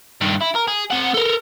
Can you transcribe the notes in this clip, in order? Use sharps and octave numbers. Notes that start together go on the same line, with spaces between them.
G2 D#3
E4
A#4
G#4
C4 F#5
A4 A#4